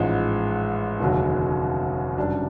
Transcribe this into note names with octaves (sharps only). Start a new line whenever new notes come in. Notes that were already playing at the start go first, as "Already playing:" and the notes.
Already playing: A1 G#2 F3 G#3
F1 D#2 D3 F#3
F#1 F#2 D#3 G3 D4